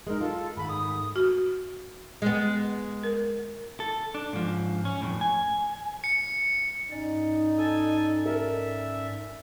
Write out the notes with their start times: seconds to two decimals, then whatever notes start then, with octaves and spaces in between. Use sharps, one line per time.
0.07 G#3 D#4 A#4
0.21 F4 A4
0.57 G#2 D#3 A3 B5
0.69 D#6
1.16 F#4
2.22 G#3 B3
3.03 A#4
3.80 A4
4.14 D4
4.33 G#2 F3
4.85 C#4
5.02 F2 A2
5.21 G#5
6.04 C#7
6.92 G#2 C#4 D#4 D5
7.58 A4 G#5
8.26 A4 A#4 E5